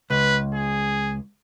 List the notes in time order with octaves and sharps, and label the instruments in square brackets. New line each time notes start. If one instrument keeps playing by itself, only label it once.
[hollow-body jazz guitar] C#2 [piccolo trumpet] B4
[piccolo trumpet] G#4